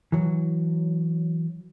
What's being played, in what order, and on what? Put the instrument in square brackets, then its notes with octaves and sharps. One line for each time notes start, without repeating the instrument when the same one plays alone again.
[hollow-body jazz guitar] E3 F#3